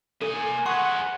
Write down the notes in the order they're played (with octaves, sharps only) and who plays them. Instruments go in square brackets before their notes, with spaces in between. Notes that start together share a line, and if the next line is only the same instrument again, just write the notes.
[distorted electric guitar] A#3 G#5 [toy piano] A4
[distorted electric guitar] G#4 B4 [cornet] F#5 [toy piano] C6 C#6